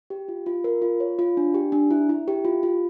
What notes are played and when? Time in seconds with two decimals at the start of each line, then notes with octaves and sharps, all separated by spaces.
0.10 G4
0.28 F4
0.46 F4
0.64 A#4
0.82 F4
1.00 C#5
1.19 F4
1.37 D4
1.54 G4
1.72 D4
1.91 E4
2.09 E4
2.28 G4
2.45 F4
2.63 F4